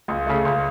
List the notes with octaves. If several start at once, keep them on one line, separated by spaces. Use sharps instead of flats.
C#2
C#3 A3
C#2